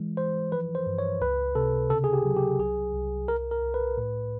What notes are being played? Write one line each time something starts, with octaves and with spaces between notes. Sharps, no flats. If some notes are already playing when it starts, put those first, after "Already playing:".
Already playing: E3 G#3
E3 C5
F3 B4
C5
G2
C#5
C#2 B4
C3 A4
C#3 A4
G#4
G4
F#3
G4
C2 G#4
C2
C2 A#4
A#4
C2
B4
A2